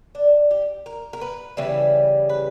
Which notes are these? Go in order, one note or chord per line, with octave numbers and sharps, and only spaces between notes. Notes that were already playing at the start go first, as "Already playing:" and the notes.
D4
G4
A#4
A#4
B4
C#3 E3 G3
B4